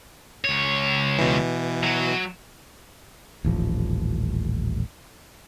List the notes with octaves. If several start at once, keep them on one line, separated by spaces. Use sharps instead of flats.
C#2 C#5
B2 E3
F#3
D#1 A1 F3